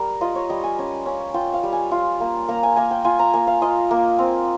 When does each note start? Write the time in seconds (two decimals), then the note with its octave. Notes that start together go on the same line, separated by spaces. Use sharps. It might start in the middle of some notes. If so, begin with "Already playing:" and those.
Already playing: G3 A#4
0.21 F4 D#5
0.35 C#5
0.49 G3 D#5
0.64 G#5
0.79 C#4
1.06 C#4
1.34 F4 G5
1.54 F5
1.63 G3
1.73 G#5
1.91 F4
2.20 A#3
2.48 A#3 A#5
2.63 G#5
2.76 A#3 G#5
2.91 G5
3.05 F4 G#5
3.19 A#5
3.34 A#3 G#5
3.47 F5
3.61 F4 D#5
3.91 A#3
4.19 C4